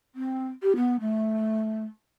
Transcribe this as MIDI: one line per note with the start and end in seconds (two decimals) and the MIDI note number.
0.15 0.48 60
0.63 0.73 67
0.76 0.97 59
1.00 1.84 57